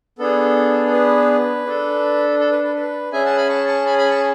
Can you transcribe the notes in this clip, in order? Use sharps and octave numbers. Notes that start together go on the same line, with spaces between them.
B3 D4 G#4 A4
A4
B4
D4 A4
A4
B4
B4
B4
C#4 G#4 E5 G#5
F#5 A5
G#5 B5
A5 C#6
A5 C#6
G#5 B5
G#5 B5
A5 C#6